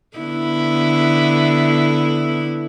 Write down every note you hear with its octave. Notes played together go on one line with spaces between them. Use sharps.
D3 B3 E4